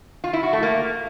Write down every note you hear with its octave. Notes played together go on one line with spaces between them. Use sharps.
F4
E4
F#4
A3
A#3